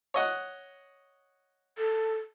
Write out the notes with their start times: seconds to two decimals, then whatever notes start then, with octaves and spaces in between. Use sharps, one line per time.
0.14 C#5 D#5 F#5
1.78 A4